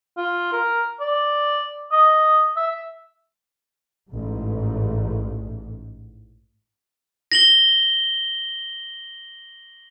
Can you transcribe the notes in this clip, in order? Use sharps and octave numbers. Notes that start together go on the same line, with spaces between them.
F4
A#4
D5
D#5
E5
A1 G#2
A#6 F#7 G7